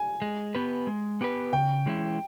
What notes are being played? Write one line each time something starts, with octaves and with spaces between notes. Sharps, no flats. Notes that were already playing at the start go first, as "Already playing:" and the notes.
Already playing: G#5
G#3
B3 G4 B4
G#3
B3 G4 B4
C#3 G5
E3 G#3 C#4 E4